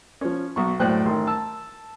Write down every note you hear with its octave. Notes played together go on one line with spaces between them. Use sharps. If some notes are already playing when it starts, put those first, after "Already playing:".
F3 C#4
B1 C#6
F#2 A2 C5 D5 G5 F#6
A1 D#3 C6
A5 E6